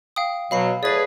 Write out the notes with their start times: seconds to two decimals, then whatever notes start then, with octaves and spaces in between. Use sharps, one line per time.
0.16 F5 G5 D#6
0.51 B2 F#3 F5 B5 C7
0.83 A2 G#4 B4 D5 A6